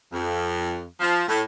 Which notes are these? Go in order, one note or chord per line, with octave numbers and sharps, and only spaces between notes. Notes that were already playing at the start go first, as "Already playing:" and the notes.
F2
F3
A2